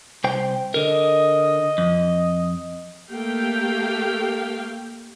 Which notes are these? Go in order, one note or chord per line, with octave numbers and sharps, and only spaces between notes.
C2 C5 G5
D3 A#4 D#5
F2
A3 A#3 G4 F5 G5